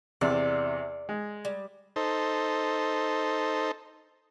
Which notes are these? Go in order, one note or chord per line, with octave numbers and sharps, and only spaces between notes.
E2 C3 D5
G#3
G3
D#4 A4 C5